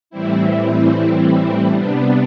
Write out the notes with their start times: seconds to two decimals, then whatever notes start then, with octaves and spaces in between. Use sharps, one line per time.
0.10 A2 E3 G3 C4 E4
1.68 C3 G3 B3 D4